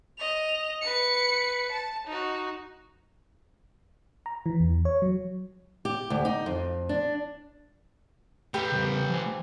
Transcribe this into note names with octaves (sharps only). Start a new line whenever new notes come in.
D#5 F7
B4 C#7
A5
D#4 F#4
A#5
E3
E2
C#5
F#3
G4
D2
D#4
F2
D4
A3 G4 B4
C#3 G3
F3 G#5